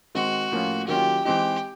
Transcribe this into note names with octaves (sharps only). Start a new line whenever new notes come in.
D#3 G#3 C4 F#4
A2 F3 A#3 C#4 F4
D#3 F#3 A#3 C#4 F4 G4
E3 G#3 C4 D#4 G4